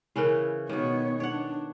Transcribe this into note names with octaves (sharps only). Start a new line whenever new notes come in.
C#3 E3 C#4 E4 A#4
B2 D#3 B3 C#5
D4 C#5 F#5